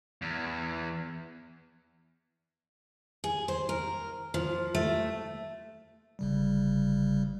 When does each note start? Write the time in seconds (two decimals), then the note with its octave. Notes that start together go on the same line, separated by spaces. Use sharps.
0.22 E2
3.24 G#4
3.48 C5
3.69 A#4
4.34 F3
4.75 A3
6.19 G1 C#3 G3